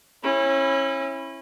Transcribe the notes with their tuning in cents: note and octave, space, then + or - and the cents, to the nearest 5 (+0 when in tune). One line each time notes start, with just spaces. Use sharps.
C#4 -30 E4 +0